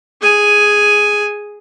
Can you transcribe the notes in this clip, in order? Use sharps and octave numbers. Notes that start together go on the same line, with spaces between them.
G#4 G#5